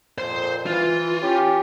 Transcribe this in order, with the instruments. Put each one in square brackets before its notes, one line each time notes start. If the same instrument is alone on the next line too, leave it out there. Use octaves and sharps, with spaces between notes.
[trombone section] F2 A#2 [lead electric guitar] C5 C6
[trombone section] E3 [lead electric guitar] F4
[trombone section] C#4 G4